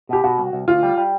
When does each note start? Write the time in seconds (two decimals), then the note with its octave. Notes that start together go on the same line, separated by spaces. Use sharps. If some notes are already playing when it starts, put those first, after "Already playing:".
0.09 B2 G4
0.24 B2 F#4
0.38 C2
0.53 C2
0.68 D2 F4
0.83 G3
0.98 G3